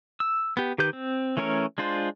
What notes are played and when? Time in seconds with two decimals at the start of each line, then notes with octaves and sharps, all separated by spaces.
0.20 E6
0.57 B3 G4
0.78 D#3 G4 B4 G6
0.93 C4
1.37 E3 A3 C#4 A#4 C#5
1.78 G#3 D4 F4 C5